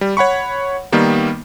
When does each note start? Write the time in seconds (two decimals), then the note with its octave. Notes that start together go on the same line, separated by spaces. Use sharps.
0.01 G3
0.17 C#5 F#5 B5 C#6
0.92 D#3 G3 A#3 B3